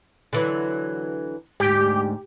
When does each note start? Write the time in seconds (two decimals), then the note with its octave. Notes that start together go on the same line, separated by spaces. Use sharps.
0.33 D3 E3 F#3
1.60 D2 G#2 G4